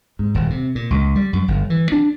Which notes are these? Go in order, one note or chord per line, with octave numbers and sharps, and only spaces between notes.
G#2
D#1
C3
A#2
C#2
G3
F#2
G1
E3
D4